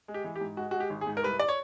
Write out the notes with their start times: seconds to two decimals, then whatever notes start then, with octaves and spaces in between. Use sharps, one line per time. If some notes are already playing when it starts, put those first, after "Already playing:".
0.08 G#3
0.14 G4
0.24 E3
0.36 G4
0.41 G#2
0.57 G#3 F#4
0.71 G#3 F#4
0.80 G4
0.90 G#1
1.01 G#4
1.07 G#2
1.17 A#4
1.23 C2 B4
1.40 D5
1.49 C#5